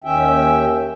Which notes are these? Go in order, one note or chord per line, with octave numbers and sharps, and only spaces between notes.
D#2 D#3 C#4 E5 G5